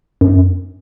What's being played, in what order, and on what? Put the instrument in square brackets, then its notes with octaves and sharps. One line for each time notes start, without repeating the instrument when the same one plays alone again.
[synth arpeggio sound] F#2